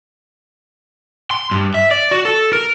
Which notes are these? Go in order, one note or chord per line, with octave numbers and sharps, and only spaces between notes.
C6
G2
E5
D5
F#4
A4
A#4